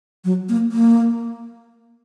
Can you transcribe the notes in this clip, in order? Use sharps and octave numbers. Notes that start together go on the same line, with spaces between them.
F#3
A#3
A#3